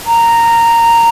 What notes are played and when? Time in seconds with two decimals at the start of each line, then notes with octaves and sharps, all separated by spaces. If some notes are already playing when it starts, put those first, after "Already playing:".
0.07 A#5